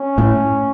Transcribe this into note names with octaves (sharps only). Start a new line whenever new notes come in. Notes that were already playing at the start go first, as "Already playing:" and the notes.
Already playing: C#4
A2